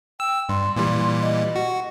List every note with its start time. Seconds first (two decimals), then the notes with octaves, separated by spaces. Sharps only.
0.20 G5 E6
0.49 G2 C6
0.76 A#2 E3 G3 C6
1.21 D#5
1.55 F#4